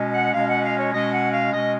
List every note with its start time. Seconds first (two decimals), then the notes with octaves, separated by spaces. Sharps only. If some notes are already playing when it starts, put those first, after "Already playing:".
Already playing: B2 G#3 C#4
0.14 F#5
0.34 B2 G#3 C#4 F5
0.49 F#5
0.64 F5
0.78 C#5
0.93 B2 G#3 C#4 D#5
1.13 F#5
1.33 F5
1.53 B2 G#3 C#4 D#5